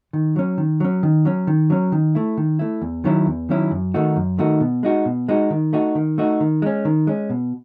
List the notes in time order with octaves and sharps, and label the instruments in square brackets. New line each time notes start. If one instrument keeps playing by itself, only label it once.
[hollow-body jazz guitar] D#3
F#3 C#4
D#3
F#3 C#4
D#3
F#3 C#4
D#3
F#3 C#4
D#3
A3 E4
D#3
A3 E4
E2
D#3 F#3 C#4 E4
E2
D#3 F#3 C#4 E4
F#2
D#3 A3 D#4 F#4
F#2
D#3 A3 D#4 F#4
B2
G#3 D#4 F#4
B2
G#3 D#4 F#4
D#3
A3 D#4 F#4
D#3
A3 D#4 F#4
D#3
G#3 C#4
D#3
G#3 C#4
B2